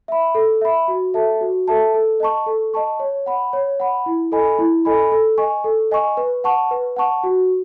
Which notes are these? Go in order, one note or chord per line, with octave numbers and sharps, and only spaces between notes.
E5 B5
A4
E5 B5
F#4
A4 E5 A5
F#4
A4 E5 A5
A4
D#5 A5 C#6
A4
D#5 A5 C#6
C#5
F#5 B5
C#5
F#5 B5
E4
A4 D#5 G#5 B5
E4
A4 D#5 G#5 B5
A4
D#5 G#5 C#6
A4
D#5 G#5 C#6
B4
F#5 A5 C#6
B4
F#5 A5 C#6
F#4